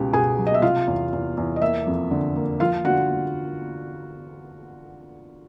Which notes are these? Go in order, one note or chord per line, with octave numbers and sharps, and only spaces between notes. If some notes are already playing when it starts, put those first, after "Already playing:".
Already playing: C#2 B2 G4
B2 G#4 G#5
F#3
D#5
E5
C3 F4 F5
E2
E2
E2
D#5
A#3 E5
F2
D3
A#3
F3 F4 F5
D3 F#4 F#5